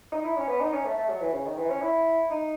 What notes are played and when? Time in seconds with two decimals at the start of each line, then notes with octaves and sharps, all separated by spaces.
0.12 D#4
0.25 E4
0.37 C#4
0.48 B3
0.61 D#4
0.73 C#4
0.85 A3
0.97 A3
1.09 F#3
1.21 E3
1.33 C#3
1.46 D#3
1.58 E3
1.70 C#4
1.82 E4
2.30 D#4